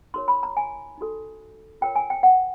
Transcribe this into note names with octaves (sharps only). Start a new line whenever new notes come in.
D#4 F#4 A#4 C#5 C6
B5
A#5
G#5
D#4 F#4 A4
F4 A#4 C#5 G5
G#5
G5
F#5